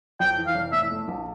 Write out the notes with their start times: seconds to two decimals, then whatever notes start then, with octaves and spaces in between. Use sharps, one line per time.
0.20 F2 G5
0.37 E3
0.47 F5
0.55 F1
0.72 A2 E5
0.91 A3
1.08 A#1